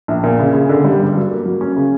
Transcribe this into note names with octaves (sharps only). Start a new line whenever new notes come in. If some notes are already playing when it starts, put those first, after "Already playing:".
A#1
A#2
C#3
C#3
D3
G3
G2
F#3
A#3
F#3
C#4
C#3